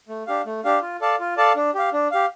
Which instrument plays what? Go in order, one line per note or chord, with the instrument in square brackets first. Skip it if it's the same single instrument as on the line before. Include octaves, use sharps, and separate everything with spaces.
[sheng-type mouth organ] A3
D4 G4 F5
A3
D4 G4 F5
F4
A4 D5 F5 A5
F4
A4 D5 F5 A5
D4
G4 F5
D4
G4 F5